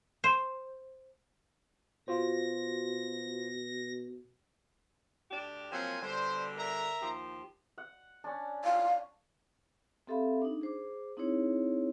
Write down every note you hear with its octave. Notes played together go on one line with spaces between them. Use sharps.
C5
B2 F4 F#4 C5 A#6
D2 D4 G4
F3 F#3 A#3 C4 F#5 G#5
B2 D3 G3 C5
A#4 E5 A#5
D#2 F3 G4
F#5
C#4 D4
F5
C4 G4 A4 E5 F5 B5
D4 D#4
G#4 C5 D6
C4 D#4 E4 G#4 C#5